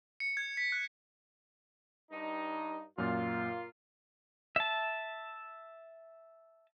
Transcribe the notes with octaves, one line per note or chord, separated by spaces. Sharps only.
C#7
G#6
B6
F#6
G2 D#4
F#2 A#2 A#3 F4
E5 A5